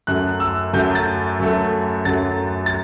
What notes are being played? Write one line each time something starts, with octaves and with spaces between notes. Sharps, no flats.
F#2 F#3 A3 F#6
E6
F#2 F#3 A3 G6
A6
F#2 F#3 A3
F#2 F#3 A3 A6
A6